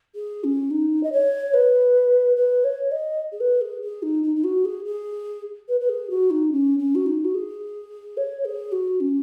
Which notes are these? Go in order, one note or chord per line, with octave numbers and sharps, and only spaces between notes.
G#4
C#4
D#4
D#5
C#5
B4
B4
C#5
D#5
G#4
B4
G#4
G#4
D#4
D#4
D#4
F#4
G#4
G#4
B4
B4
G#4
F#4
D#4
C#4
C#4
F#4
D#4
F#4
G#4
C#5
G#4
F#4
C#4